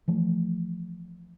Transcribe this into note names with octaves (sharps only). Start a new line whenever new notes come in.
E3 F3 A3